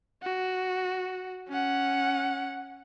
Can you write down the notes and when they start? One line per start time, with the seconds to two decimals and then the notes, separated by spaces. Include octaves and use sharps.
0.23 F#4
1.49 C#4 F#5